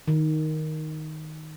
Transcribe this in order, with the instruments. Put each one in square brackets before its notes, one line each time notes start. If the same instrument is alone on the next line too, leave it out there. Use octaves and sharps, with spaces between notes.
[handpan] D#3